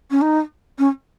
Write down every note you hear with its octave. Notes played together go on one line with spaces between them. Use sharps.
C#4
D#4
C#4